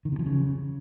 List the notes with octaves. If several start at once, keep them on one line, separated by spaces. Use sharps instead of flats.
D#3
C3
F3
C#3